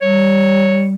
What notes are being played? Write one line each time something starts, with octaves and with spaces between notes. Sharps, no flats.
G3 C#5